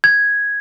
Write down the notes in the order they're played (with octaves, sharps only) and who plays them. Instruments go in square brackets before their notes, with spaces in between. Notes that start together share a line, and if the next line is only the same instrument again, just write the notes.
[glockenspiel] G#6